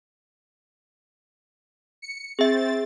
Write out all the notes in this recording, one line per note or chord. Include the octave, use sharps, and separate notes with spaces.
C#7
C4 G#4 E5 A6